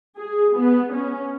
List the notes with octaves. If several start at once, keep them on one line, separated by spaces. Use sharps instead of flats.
G#4
B3
C#4